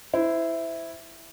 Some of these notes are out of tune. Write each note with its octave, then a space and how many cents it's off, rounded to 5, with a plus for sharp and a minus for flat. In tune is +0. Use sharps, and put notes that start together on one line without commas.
E4 +0 C5 -25